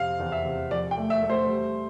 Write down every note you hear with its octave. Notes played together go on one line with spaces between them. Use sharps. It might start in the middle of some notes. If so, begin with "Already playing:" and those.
Already playing: F2 C3 C4 F5
E2
E5
C3
F3 D5
G5
A3
E5
A3
C5
G3